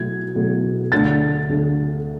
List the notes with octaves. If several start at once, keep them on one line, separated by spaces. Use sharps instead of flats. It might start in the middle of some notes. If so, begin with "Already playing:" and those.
Already playing: B2 F#3 A3 E4 G#6
B2 F#3 A3 E4
D2 D3 A3 A6
D2 D3 A3